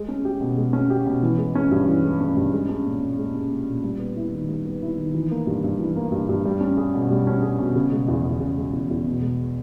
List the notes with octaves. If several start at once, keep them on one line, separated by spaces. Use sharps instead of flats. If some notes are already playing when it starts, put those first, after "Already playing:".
Already playing: G#3
C#4
G4
B2
G#3
C#4
G4
B2
E3
G#3
C#4
G2
E3
G#3
C#4
G2
G#3
C#4
A#2
A#2
G#3
C#4
A#2
A#2
G3
B3
E4
D#3
G3
B3
E4
D#3
E3
A#3
G2
G2
E3
A#3
G2
G2
G3
C#4
G#4
B2
G3
C#4
G#4
B2
C#3
G#3
E2
E2
C#3
G#3
E2
E2
B2
G#3